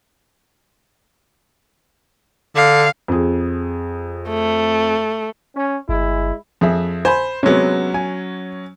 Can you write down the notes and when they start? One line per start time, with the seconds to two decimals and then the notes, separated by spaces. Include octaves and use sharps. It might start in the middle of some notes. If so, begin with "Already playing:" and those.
2.56 D3 F5
3.08 F2 G#4
4.30 A3
5.55 C#4
5.89 G1 G#3 E4
6.61 F2 G#4 E5
7.05 C5 G#5 B5
7.43 C3 F#3 G#3 B3 C#4
7.94 G#5